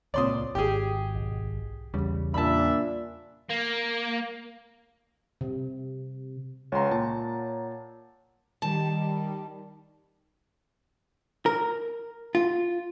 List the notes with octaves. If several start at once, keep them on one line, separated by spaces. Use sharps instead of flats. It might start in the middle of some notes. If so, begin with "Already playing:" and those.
C#2 A#2 C4 C#5 D5 C6 D#6
G#1 G4 G#4 G5
B1
E2 C#3 G3
A#2 D4 E5 A5 B5
A#3
C3
C#2 C#5 F#5 A#5 C6
A#2 A5
D#3 G3 A5
A#4
F4